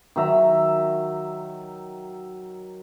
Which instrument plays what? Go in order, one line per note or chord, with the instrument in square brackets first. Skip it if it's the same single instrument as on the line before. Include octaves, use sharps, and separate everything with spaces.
[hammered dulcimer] D#3 F#3 E5 A#5